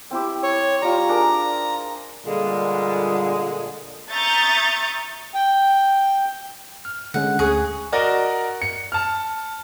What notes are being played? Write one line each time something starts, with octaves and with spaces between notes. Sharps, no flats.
C4 E4 G4
C#5
G3 F4 A#5
D4 G#4 A#4
A#2 D3 G3 G#3
E5 A#5 C#6 D#6 G6 A6
G5
F6
D3 G#3 C#4 F#5
D2 G#4 C#6 F#6
F#4 A#4 D5 D#5 A#5
C#7
A5 F6